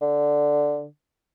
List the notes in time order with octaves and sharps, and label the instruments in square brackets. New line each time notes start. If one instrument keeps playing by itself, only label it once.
[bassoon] D3